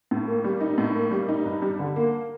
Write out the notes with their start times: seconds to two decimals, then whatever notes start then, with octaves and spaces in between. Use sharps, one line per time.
0.11 A2
0.28 A#3
0.44 G3
0.61 D#4
0.78 A2
0.95 A#3
1.11 G3
1.29 D#4
1.46 G2
1.62 G3
1.79 D3
1.96 A#3